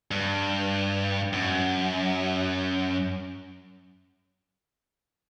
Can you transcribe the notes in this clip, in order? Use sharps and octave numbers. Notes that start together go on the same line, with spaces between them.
G2
F#2